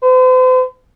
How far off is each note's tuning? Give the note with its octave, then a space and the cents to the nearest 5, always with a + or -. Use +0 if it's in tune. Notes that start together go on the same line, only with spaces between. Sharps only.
C5 -45